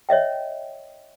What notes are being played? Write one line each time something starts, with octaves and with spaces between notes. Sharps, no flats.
C#5 D#5 E5 G5